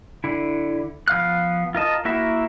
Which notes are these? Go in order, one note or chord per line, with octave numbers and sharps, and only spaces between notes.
D3 E4
F3 B3 F5 F6 F#6
F4 A#4 D#5 A5
A#3 E4 F#4 A#4 E5